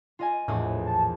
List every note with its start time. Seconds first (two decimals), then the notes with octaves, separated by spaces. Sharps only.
0.19 F4 D#5 G#5
0.48 A#1 E2 A2 D#6
0.86 A5